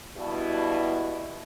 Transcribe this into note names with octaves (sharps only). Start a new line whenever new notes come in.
G2 B2 E4